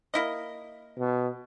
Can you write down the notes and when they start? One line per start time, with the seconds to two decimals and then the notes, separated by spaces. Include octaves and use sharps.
0.14 A#3 E4 D#5
0.98 B2